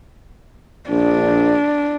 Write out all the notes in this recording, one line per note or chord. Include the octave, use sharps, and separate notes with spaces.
A#1 D4